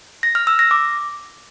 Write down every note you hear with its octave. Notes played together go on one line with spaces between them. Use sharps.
A#6
F6
E6
A#6
D6